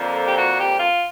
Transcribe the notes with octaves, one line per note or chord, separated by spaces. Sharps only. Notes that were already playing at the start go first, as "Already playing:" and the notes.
Already playing: F2 D3 F3 A#3
G4
F#4
G4
F4